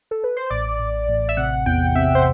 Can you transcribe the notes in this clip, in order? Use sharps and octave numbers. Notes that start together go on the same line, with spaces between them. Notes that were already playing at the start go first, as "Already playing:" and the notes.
A4
B4
C5
A1 D5
A1
A1
E5
C3 F#5
E2 G5
C3 E5
C5